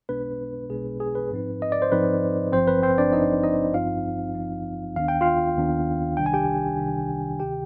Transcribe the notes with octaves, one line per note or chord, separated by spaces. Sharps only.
B1 B2 G#3 B3 D4 B4
B1 B2 G#3 B3 D4 G#4
G#4
B4
G#2 F3 C4 D#4
D#5
D5
C5
G#2 F3 C4 D#4 B4
G#1 G2 F3 C4 C5
B4
C4 C5
D4 D5
G#1 G2 F3 D#4 D#5
D#4 D#5
G#1 G2 F3 C4 D#4 F4 F5
G#1 G2 F3 C4 D#4
D#2 D#3 B3 D4 F5
G5
F4 F5
D#2 D#3 B3 D4
C2 C3 D#3 G3 D4 G5
G#5
G4 G5
C2 C3 D#3 G3 D4
D2 C3 D#3 G4 G5